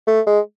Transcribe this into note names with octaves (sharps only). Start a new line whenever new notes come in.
A3
G#3